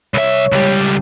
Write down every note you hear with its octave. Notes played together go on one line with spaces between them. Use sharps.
C2 C#5 E5
C#2 G3